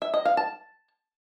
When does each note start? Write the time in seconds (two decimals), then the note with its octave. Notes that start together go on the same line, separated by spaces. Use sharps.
0.02 E5
0.14 D#5
0.25 F5
0.37 A5